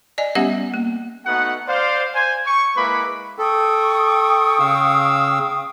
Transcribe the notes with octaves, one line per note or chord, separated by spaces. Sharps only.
D5 D#5 G#5
G3 B3 C#4 G4 E5 F#5
A#3
A3 B3 D#4 F#4 F#5
C5 D5 F5
C5 G#5
C#6
G#3 A#3 E4 B4 B5 D6
A4 G5 C#6 D#6
C#3 F5 E6